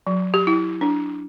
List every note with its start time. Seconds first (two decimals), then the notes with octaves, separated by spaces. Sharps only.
0.07 F#3
0.34 G4
0.47 E4
0.81 D4